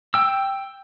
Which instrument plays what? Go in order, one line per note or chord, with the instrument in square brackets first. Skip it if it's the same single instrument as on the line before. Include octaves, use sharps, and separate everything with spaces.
[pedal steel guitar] G5 E6